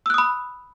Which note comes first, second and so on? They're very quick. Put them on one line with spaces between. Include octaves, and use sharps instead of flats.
E6 F#6 D#6 B5